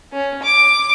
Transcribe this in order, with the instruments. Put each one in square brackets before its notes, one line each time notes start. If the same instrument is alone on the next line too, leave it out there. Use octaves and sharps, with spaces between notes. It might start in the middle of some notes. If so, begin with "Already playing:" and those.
[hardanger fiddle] C#4
D6